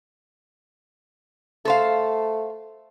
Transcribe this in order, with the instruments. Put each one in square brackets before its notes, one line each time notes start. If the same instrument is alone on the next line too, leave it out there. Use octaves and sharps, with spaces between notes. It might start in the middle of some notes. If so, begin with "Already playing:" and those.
[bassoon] A3 [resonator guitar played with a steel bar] A4 C5 F5